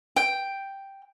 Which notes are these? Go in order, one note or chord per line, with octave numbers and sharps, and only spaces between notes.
G5